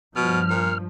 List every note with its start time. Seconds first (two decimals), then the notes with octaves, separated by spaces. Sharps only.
0.16 G2 B2 F3 F6
0.50 A#2